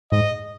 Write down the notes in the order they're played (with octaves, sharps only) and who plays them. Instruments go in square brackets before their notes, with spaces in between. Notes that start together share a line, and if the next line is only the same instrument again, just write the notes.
[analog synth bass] G#2 [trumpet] D#5